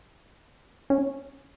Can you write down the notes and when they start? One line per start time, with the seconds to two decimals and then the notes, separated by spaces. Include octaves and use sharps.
0.90 C#4